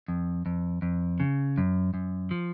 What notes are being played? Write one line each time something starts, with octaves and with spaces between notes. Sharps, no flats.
F2
F2
F2
C#3
F#2
F#2
F3